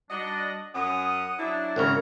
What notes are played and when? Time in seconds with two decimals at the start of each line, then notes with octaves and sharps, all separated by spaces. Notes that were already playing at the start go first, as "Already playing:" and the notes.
0.11 G3 D4 F#4 D#5
0.75 F#2 C#4 F#5 D#6
1.39 F#3 D4 E4
1.76 G#1 C#3 A#4 C#5